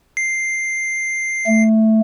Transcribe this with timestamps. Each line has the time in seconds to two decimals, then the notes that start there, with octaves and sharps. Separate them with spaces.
0.17 C7
1.47 A3